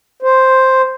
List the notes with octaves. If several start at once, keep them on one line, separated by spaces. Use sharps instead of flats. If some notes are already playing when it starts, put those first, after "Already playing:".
C5